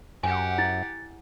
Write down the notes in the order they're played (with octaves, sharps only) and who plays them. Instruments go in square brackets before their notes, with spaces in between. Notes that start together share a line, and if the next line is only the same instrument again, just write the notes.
[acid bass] F#2 [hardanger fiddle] G4 F#5 [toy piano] G#5
[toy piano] E4 [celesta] A6